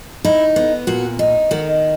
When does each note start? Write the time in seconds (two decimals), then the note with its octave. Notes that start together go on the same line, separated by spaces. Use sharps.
0.25 D#4 E4
0.56 B3
0.87 A#2 F#4
1.19 D#4
1.51 D#3 F#4